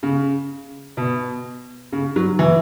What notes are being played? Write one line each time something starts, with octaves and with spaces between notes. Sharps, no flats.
C#3
B2
C#3
F#3
E3